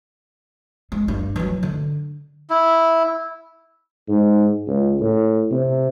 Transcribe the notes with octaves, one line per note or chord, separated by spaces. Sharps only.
G#3
G2
E3 F#3
D3
E4
G#2
C#2
A2
C3